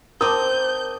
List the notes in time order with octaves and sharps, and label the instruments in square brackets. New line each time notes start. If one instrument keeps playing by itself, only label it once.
[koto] C4 D#4 [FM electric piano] A#4 [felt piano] A5 D6 D#6 [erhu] G6